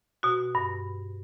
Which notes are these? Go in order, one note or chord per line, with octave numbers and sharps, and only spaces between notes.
B2 F#4
G2